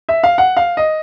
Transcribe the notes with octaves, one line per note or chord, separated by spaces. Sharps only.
E5
F5
F#5
F5
D#5